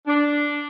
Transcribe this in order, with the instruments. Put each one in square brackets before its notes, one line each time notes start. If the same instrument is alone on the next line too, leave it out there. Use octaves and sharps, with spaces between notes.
[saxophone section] D4